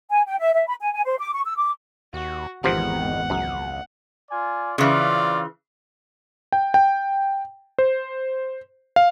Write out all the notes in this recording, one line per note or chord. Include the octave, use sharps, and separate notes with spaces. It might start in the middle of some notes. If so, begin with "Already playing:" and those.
G#5
G5
E5
E5
B5
G#5
G#5
C5
D6
C#6
E6
D6
D#2 F#4
G#1 E2 C3 D#3 F3 F#5
C#2 F#2
F4 D5 G#5
C#3 E3 C4 F4 D5
G5
G5
C5
F5